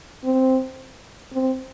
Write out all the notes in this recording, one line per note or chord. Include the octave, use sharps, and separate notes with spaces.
C4
C4